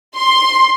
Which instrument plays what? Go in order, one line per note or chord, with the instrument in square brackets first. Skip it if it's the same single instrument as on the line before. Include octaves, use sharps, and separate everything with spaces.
[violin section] C6